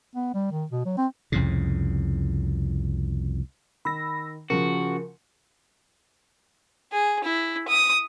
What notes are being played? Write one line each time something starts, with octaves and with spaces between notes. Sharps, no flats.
B3
G3
D#3
B2
F#3
C4
C2 F2 A2 C#3
D#3 B5 E6 A#6
C#3 F3 F#4 A#4
G#4
E4
D#6